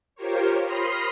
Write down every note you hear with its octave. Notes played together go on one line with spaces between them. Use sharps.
F4 G4 A#4 C5 C#5
B5 C6 D#6 F6 A#6 C7